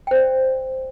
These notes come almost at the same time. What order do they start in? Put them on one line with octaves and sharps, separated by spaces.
G5 C5 D5